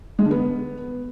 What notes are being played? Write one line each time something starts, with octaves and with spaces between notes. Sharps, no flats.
G#3
D3
B3